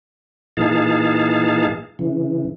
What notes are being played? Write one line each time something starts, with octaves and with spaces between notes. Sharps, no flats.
A#2 E3 D#4 G#4 F5 A5
C#3 E3